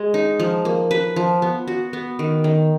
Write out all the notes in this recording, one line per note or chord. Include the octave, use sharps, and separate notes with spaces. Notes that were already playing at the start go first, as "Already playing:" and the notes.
Already playing: G#3
D#4
F3
A#3
B4
F3
B3
F#4
B3
D#3
D#3